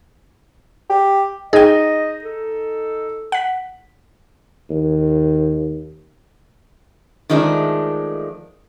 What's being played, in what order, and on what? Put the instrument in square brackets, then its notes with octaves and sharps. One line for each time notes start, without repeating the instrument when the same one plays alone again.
[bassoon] G4
[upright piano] D#4 [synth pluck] G#4 G5 [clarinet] D#5
[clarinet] A4
[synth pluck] F#5 B6
[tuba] D#2
[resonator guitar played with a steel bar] D#3 F3 G#3 A3 D4